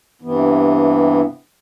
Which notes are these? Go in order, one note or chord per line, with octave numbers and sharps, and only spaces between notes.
G2 C3 E3 B3